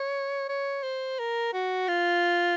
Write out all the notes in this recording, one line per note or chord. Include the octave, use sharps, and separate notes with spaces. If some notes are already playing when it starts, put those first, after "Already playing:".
Already playing: C#5
C#5
C5
A#4
F#4
F4